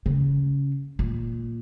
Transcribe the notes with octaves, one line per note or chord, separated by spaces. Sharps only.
C#3
A#2